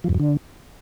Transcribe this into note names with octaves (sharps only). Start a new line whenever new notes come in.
F3
F2
F#2
D3